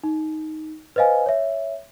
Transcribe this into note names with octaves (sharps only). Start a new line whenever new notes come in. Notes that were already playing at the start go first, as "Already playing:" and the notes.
D#4
B4 C5 D#5 F5 G#5
C#5 E5